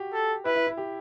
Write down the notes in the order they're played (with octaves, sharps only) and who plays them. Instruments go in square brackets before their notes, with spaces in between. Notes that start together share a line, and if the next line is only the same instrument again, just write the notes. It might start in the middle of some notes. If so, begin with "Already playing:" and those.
Already playing: [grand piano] F#4 G4
[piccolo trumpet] A4
[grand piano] E4 [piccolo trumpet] B4
[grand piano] E4
E4
G4